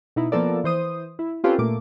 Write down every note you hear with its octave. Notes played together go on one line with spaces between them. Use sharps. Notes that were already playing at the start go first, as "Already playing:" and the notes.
B2 D#4 E4
F3 A#3 B3 A4 A#4 D5
E3 C5 D#6
E4
C4 C#4 F4 G4 A4 B4
A#2 A3 A#3 D6